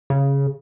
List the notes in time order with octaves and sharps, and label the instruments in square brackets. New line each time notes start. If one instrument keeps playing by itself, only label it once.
[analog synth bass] C#3